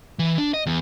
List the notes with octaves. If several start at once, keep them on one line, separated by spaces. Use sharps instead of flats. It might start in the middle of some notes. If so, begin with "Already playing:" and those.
E3
D4
D#5
E2